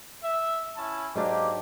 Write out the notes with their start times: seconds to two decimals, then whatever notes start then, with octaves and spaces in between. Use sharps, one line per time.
0.24 E5
0.77 C#4 E4 A5
1.16 G#2 F#3 A#3 D4 G4